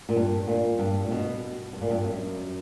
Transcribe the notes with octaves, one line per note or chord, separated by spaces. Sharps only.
A#2
G2
A#2
G2
A#2
B2
G2
A#2
G2
F#2